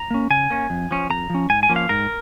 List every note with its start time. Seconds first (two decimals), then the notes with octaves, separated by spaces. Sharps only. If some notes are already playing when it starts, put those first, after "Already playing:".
Already playing: A#5
0.11 A#3 C#4
0.30 C#3 G#5
0.50 A#3 C#4
0.70 F2
0.91 F3 C#4
1.10 F2 A#5
1.30 F3 C#4
1.50 G#2 G#5
1.63 G#5
1.69 F3 A#3 C#4
1.76 F5
1.89 G#2 A#4